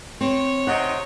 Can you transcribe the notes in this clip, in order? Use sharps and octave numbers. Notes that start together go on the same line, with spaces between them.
C4 C#5
C3 D#4 D#5 F#5